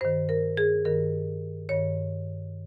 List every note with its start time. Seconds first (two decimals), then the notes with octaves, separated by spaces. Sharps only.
0.01 G2 C5
0.05 D#3
0.29 A#4
0.57 G#4
0.85 G2 D#3 A#4
1.69 G2 D#3 C#5